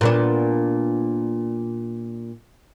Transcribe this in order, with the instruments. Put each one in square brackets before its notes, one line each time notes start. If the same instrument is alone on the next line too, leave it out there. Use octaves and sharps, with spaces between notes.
[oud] A#2 B3 D4